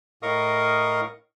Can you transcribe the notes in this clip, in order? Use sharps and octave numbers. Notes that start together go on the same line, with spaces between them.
A2 A#4 D#5 F5 C#6 D#6